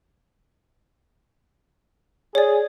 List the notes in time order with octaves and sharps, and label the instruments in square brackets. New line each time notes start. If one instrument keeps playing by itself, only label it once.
[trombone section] G#4 [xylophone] C#5 D5